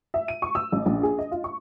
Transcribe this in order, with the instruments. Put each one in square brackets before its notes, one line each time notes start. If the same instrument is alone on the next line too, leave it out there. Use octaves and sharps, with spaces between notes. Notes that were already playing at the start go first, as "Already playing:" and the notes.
[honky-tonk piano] E5
D#7
C#6
E6
A1
A#1
G#4
D#5
F4
C#6